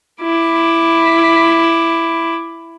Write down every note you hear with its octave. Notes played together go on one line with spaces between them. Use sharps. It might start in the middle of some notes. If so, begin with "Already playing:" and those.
E4 D6